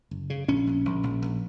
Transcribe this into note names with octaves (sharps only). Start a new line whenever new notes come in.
F#1
C#3
A#1 C#4
A#1
A#1
A#1
A#1